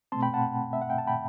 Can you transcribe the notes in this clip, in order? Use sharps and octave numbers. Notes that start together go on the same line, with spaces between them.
B2 A3 C4 A5 C6
G5 B5
F#5 A5
E5
F#5
G5
A5
G5 B5